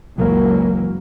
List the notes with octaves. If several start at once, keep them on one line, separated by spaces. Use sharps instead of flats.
F#1 C#2 E3 F#3 A#3